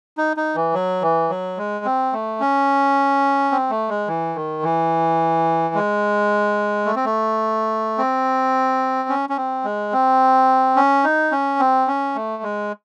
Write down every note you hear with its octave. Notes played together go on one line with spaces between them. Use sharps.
D#4
D#4
E3
F#3
E3
F#3
G#3
C4
A3
C#4
C4
A3
G#3
E3
D#3
E3
G#3
A3
C4
A3
C4
C#4
C#4
C4
G#3
C4
C#4
D#4
C#4
C4
C#4
A3
G#3